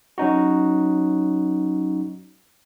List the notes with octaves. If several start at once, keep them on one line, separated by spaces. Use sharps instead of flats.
F#3 C#4 D#4 F#4